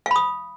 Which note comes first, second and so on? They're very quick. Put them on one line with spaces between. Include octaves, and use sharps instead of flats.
F5 B5 D#6